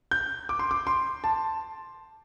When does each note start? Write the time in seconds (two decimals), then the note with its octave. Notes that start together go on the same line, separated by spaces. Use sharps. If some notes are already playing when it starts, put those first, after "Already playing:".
0.11 G6
0.49 D6
0.59 C6
0.71 D6
0.87 C6
1.24 A5